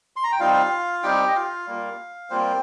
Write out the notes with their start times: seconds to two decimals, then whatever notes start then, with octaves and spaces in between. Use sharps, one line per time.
0.16 C6
0.24 A#5
0.32 G5
0.40 G3 C4 D#4 F4 F5
1.03 G3 C4 D#4 G4 G5
1.28 D#5
1.35 F4 F5
1.67 G3 A#3 F4
2.30 G3 A#3 C4 F4 C5